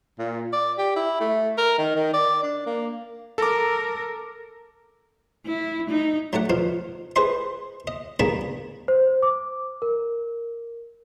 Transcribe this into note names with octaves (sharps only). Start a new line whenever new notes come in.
A#2
D5
G4
E4
A3
A#4
D#3
D#3
D5
D4
A#3
A4 A#4 D6
E4
D#4
F#3 A3 D5 F#5
B2 F3 F5
G#4 B4 C5 D#5 C6
D#5
G2 A#3 B3 G#4 A5 B5
C5
D6
A#4